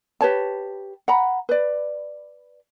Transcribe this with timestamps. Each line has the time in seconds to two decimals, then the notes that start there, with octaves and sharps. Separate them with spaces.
0.21 G4 B4 C#5 A5
1.08 F#5 A#5 B5
1.49 B4 D5